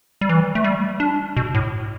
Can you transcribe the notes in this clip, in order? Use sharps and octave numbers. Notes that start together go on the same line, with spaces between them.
G3
E3
A3
G3
D4
B2
A2